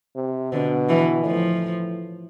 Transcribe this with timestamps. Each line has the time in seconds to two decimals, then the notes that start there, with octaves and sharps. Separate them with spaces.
0.16 C3
0.53 B2 D3
0.89 E3
1.26 A2 F3